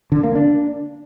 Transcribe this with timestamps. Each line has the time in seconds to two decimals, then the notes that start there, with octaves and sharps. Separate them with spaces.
0.12 D3
0.23 A#3
0.35 D4